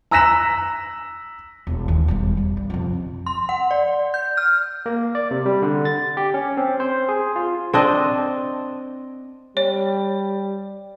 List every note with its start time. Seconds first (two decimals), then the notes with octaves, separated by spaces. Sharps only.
0.11 A#5 E6 F#6 A#6 B6 E7
1.67 E1 C2
1.88 D#2
2.08 E1 G2
2.37 G3
2.57 G2
2.70 F2 C3
3.26 C6
3.49 F#5
3.71 D5
4.14 G6
4.37 F6
4.86 A#3
5.15 D5
5.31 C3
5.46 G3
5.62 D3
5.85 A6
6.17 G4
6.34 C#4
6.57 C4
6.80 C5
7.09 G#4
7.36 F4
7.73 C4 D4 D#5
9.57 G3 C#5